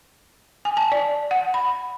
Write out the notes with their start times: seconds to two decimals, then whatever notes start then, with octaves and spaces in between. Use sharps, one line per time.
0.65 G#5
0.77 A5
0.92 D5
1.31 F#5
1.54 B5